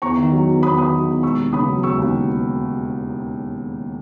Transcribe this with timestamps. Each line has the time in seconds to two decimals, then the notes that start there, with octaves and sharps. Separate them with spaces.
0.02 E2 A#5 C#6
0.17 D#3
0.32 F#3
0.47 E2
0.63 E2 B5 D#6
0.77 D#3 B5 D#6
0.93 F#3
1.08 E2
1.23 E1 C#6 E6
1.38 D#2
1.53 C#3 B5 D#6
1.68 F#3
1.83 E1 C#6 E6
1.98 D#2